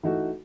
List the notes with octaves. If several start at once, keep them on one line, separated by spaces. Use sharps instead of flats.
E3 A3 D#4 F#4